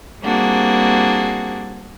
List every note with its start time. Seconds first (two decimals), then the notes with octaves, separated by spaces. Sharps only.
0.24 G3 A#3 C4 D4 F#4 G#4